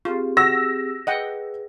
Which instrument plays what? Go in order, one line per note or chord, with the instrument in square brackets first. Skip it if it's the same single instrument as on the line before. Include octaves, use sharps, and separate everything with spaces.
[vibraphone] C4 G4 G#4 [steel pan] F4
[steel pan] F#4 [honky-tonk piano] E6 A#6
[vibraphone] G#4 B4 [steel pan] D#5 F#5 G5